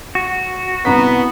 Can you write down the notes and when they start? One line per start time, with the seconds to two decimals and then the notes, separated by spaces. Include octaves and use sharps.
0.15 F#4
0.85 C2 B3 A#5 B6